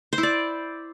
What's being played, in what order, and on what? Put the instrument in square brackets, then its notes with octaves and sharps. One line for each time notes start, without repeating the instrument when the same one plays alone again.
[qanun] C5
E4
D5